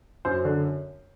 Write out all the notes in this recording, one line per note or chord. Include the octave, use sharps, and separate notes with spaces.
F#2 C5
D3